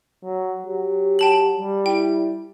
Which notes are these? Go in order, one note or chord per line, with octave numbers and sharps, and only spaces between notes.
F#3
F#3 G4
G5 A5 F#7
G3
E4 G5